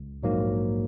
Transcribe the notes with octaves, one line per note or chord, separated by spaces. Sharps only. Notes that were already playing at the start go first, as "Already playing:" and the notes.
Already playing: C#2
A#1 G#2 F#3 A#3